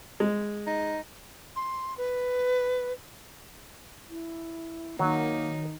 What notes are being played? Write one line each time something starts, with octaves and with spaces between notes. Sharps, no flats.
G#3
D#4
C6
B4
E4
D#3 F#3 A#3 D#4